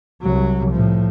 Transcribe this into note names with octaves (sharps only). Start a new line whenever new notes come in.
C2 F#3
A2 F3